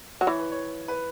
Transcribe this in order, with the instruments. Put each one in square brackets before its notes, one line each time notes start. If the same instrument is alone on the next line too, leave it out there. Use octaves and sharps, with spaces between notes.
[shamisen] F#3
[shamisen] E3 [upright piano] C#5
[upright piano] B4
C#5
B4